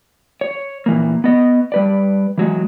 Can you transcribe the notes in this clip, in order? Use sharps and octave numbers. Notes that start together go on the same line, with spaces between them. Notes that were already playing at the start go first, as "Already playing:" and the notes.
C#5
A#2 E3 A#3
B3 D#5
G3 B4 D5
E3 F#3 G#3